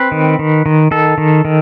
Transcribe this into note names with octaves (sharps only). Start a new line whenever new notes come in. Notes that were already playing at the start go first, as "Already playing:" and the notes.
Already playing: C4 B4
D#3
D#3
D#3
D#3 A4
D#3
D#3